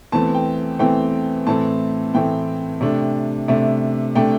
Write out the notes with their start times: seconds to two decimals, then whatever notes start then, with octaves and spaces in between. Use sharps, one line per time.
0.12 E2 E3 A3 C4 A5
0.35 G5
0.79 E2 E3 A3 C4 G5
1.47 A2 E3 A3 C4 A5
2.14 A2 E3 A3 C4 G5
2.81 C3 A3 D4
3.48 C3 A3 D4 E5
4.15 C3 A3 D4 G5